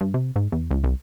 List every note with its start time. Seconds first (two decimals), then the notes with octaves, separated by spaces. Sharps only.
0.01 G2
0.14 C3
0.36 G#2
0.52 E2
0.71 C#2
0.84 C2